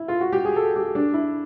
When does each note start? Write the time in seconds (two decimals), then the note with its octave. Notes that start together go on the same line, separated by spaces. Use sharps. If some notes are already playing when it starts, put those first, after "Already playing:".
Already playing: E4
0.08 F4
0.21 F#4
0.33 G4
0.45 G#4
0.56 A4
0.76 G4
0.95 D4
1.14 E4